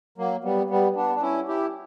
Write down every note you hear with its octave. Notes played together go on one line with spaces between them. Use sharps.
F#3 A#3
G3 B3
G3 B3
B3 D4
D4
C#4 E4
E4 G4